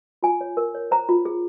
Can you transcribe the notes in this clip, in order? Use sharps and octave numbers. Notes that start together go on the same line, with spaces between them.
F4 G#5
C#5
A#4
C#5
C5 A#5
F4
G#4